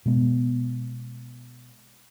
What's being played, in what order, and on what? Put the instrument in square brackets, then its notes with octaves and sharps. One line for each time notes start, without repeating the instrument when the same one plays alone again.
[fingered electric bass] B2 G#3 B3